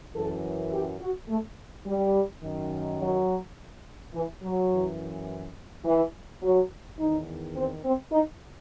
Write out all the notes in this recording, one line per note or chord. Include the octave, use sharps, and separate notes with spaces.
F#2 E3 A4
G4
F#4
A3
G3
F#2 D#3
F#3
E3
F#3
F#2 E3
E3
F#3
E2 D#3 D#4
C4
C4
D#4